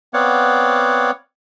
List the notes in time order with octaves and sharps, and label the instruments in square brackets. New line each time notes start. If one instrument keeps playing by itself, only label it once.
[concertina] B3 C4 C#5 D5 F5 F#5